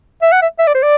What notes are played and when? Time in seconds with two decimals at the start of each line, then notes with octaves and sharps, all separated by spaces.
0.22 E5
0.32 F#5
0.42 E5
0.59 E5
0.67 D5
0.74 C5
0.82 D5